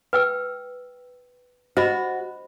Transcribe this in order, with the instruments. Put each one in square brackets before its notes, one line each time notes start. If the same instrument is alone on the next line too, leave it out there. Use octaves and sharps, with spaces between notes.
[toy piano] B4 G5 E6
[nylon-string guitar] F#4 [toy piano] C5 D#5 B5